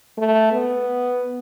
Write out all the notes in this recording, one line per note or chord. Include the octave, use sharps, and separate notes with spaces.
A3
B3